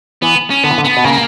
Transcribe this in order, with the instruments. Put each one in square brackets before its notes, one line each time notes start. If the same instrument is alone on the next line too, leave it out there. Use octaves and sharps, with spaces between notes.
[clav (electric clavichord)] E3 [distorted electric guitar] B3
[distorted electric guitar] C#4
[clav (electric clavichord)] D3 [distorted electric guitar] B3
[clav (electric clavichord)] E3
D3
[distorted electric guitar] B3
[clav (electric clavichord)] B2
[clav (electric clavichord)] C#3 [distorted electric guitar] A#3